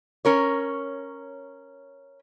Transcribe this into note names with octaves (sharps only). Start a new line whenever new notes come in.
C#4 A#4 C#5